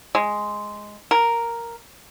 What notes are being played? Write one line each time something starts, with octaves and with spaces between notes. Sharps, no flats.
G#3
A#4